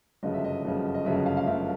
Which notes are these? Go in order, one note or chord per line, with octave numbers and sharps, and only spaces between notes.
G1 F#2 C#3 F3 D#5
E5
D#5
G1 F#2 C#3 F3
D#5
G1 F#2 C#3 F3 E5
F5
F5
G1 F#2 C#3 F3 E5